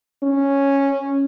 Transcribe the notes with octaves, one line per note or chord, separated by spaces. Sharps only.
C#4